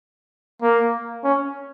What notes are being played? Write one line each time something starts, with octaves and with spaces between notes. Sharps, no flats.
A#3
C#4